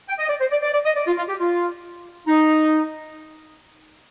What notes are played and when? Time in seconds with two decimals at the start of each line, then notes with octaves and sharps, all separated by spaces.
0.08 G5
0.19 D#5
0.29 D5
0.41 C5
0.51 D5
0.63 D5
0.73 D5
0.85 D#5
0.96 D5
1.07 F4
1.17 F4
1.28 G4
1.40 F4
2.27 D#4